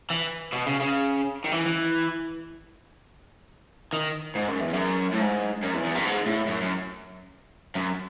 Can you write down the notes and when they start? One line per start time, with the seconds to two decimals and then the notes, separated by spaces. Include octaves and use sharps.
0.10 E3
0.53 B2
0.67 C#3
0.81 C#3
1.44 D#3
1.52 E3
1.66 E3
3.93 D#3
4.35 G#2
4.48 F#2
4.60 E2
4.73 F#2
5.12 A2
5.20 G#2
5.63 F#2
5.73 E2
5.84 E2
5.95 F#2
6.05 G#2
6.26 A2
6.47 F#2
6.61 F#2
7.75 F#2